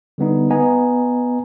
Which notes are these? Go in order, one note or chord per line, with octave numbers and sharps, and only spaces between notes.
D3 G3 B3 D#4
B3 D#5 G#5 A#5